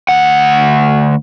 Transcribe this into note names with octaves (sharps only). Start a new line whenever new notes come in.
D2 F#5